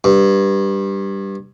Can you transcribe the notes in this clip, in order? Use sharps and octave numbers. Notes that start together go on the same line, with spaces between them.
G2